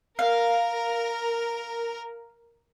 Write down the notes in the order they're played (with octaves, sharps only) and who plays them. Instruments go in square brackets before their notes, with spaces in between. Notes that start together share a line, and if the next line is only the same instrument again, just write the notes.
[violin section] A#4 [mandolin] F5